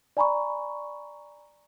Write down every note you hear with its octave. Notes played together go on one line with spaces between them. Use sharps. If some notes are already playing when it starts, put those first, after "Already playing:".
D5 G#5 A#5 B5 C#6